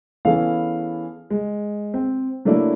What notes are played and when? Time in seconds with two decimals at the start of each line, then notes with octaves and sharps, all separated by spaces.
0.25 E3 B3 C#4 G#4 A4 F5
1.30 G#3
1.94 C4
2.45 F#3 A3 A#3 D4 E4